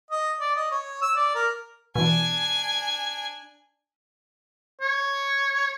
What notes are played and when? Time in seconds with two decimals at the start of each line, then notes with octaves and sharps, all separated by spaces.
0.11 D#5
0.40 D5
0.56 D#5
0.71 C#5
1.02 E6
1.16 D5
1.35 A#4
1.95 B2 E3 D4 G#5
4.81 C#5